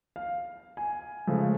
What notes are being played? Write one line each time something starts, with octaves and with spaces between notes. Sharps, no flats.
F5
G#5
C#3 F3 G#3 A3